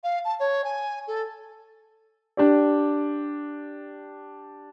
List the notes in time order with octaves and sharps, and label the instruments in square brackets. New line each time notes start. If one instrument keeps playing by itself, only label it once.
[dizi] F5
A5
C#5
G#5
A4
[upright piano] D4 G4 D5